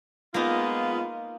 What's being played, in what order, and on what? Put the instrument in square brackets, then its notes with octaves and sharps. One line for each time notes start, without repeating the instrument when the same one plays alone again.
[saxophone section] G#3 B3 F4 [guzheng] A#3 D#4